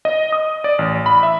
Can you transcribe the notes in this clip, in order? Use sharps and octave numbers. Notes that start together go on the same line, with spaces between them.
D#5
D#6
D5
A1
B5
E5